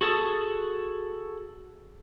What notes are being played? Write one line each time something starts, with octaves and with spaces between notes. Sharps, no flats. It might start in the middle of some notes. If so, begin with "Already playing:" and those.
F#4 G#4 A4 A5 D#6